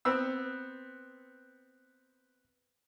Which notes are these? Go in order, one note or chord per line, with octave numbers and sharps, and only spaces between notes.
B3 C4 E6